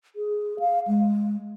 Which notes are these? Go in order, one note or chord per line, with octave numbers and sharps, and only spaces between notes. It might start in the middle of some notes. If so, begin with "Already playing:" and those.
G#4
F5
G#3